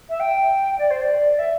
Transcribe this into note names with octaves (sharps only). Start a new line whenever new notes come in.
E5
G5
D5
C5
D5
E5